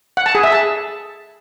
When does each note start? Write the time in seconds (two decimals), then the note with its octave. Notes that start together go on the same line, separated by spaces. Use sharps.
0.17 F#5
0.26 A5
0.35 G#4
0.44 E5
0.52 A5